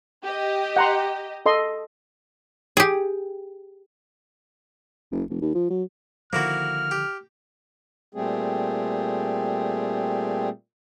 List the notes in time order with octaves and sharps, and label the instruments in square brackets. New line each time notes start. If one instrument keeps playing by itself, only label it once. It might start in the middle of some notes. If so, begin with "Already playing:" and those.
[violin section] G4 D#5
[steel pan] F#5 A#5 C6
A4 D#5 C6
[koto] G4 G#4
[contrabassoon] F#1
F1
D#2
F3
F#3
[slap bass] D3 D#3 F3 [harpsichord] A#3 E4 F#4 [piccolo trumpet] F6
[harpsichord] G4
[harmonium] A#2 G3 A3 C4 G#4